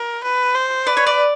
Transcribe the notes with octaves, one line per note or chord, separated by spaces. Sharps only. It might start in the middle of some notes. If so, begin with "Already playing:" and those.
Already playing: A#4
B4
C5
B4 D5
C#5
D5